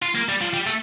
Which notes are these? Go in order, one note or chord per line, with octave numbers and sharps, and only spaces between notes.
F4
A#3
G3
F3
G3
A3